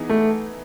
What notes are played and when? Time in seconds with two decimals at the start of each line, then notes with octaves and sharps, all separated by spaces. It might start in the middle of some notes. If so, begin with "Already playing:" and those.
Already playing: E3 B3 D#4 G#4
0.09 A3